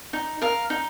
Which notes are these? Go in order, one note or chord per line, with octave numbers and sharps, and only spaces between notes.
D#4
A#4 F5
D#4